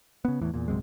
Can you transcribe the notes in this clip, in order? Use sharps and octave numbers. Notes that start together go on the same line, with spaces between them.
C#3 B3
E2 A2 E3
E2 A#2
A#1 F#2 C3 G#3